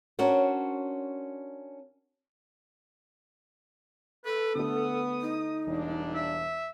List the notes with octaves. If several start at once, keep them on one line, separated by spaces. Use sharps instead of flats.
C#4 D4 F#4 A#4 C5
A4 B4
D3 A3 B3 D#6
D#4
E1 A#2 G3 D4
E5